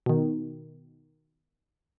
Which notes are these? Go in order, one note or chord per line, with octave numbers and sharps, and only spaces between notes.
B2 D#3